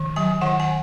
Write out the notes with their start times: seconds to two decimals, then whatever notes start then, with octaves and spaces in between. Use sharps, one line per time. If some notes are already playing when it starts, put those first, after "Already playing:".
Already playing: D#3
0.16 F#3 G#5
0.41 D#3 F#5
0.60 G#5